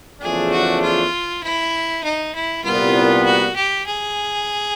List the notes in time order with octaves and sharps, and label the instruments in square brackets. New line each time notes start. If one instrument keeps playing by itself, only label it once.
[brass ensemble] E2 C#3 F3 A3 D4 [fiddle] G#4
[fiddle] F#4
F4
E4
D#4
E4
[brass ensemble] C2 A#2 G3 B3 [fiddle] F4
[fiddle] F#4
G4
G#4